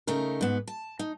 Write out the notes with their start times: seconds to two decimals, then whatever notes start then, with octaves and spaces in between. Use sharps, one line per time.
0.07 C#3 A3 D#4 A#4
0.41 G#2 B3
0.68 A5
0.99 D#4